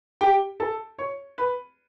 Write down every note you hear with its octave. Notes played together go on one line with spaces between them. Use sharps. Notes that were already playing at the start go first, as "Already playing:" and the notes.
G4 G5
A4 A5
C#5 C#6
B4 B5